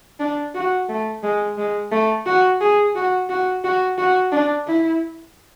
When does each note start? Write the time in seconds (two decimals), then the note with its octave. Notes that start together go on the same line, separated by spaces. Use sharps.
0.20 D4
0.55 F#4
0.89 A3
1.23 G#3
1.58 G#3
1.91 A3
2.26 F#4
2.61 G#4
2.95 F#4
3.30 F#4
3.64 F#4
3.98 F#4
4.32 D4
4.67 E4